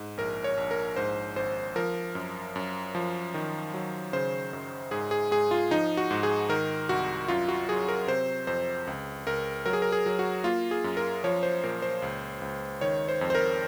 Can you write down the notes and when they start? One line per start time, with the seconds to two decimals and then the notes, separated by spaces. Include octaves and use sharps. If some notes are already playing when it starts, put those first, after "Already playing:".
Already playing: G#2
0.17 A#1 A#4
0.44 C#5
0.57 A#1
0.71 A#4
0.96 G#2 C5
1.36 G#1 C5
1.76 F3 A#4
2.15 F#2
2.56 F#2
2.95 F3
3.34 D#3
3.74 F#3
4.13 C#3 C5
4.53 F#2
4.91 G#2 G#4
5.11 G#4
5.31 G#2 G#4
5.51 F4
5.71 F3 D#4
5.97 F#4
6.11 G#2
6.23 G#4
6.49 D#3 A#4
6.89 C2 F#4
7.28 F#2 F4
7.48 F#4
7.69 F#3 G#4
7.88 A#4
8.08 C3 C5
8.47 F2 C5
8.87 C#2
9.27 C#2 A#4
9.66 F#3 A#4
9.73 G#4
9.82 A#4
9.92 G#4
10.06 F#3
10.19 F#4
10.44 A#3 F4
10.71 G#4
10.84 F#2
10.97 A#4
11.24 F3 C#5
11.43 C5
11.64 A#2 A#4
11.82 C5
12.02 C#2
12.42 C#2
12.81 D#3 C#5
13.08 C5
13.21 F2
13.30 C5
13.35 A#4